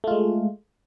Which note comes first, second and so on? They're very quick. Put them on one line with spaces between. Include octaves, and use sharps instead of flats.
A3 F4 G#3